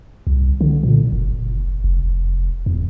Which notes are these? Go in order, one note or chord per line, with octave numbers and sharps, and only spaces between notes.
C2
D3
A#2
F#1
F1
E2